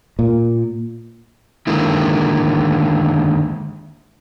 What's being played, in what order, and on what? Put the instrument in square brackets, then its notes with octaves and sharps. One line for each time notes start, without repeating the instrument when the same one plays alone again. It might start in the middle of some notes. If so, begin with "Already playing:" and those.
[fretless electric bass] A#2
[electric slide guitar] D3 D#3 G#3 A#3 E4